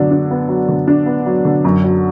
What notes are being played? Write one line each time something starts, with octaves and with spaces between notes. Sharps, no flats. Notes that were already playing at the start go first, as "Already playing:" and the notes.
Already playing: D3 F#3 B3 D4
D4
B3
F#3
D3
D4
B3
F#3
D3
F#2
F#3